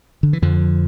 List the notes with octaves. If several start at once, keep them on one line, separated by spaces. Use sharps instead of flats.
D3
E3
F2 D3 F3